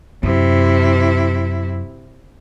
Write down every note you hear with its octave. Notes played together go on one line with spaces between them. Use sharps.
F#2 C3 E4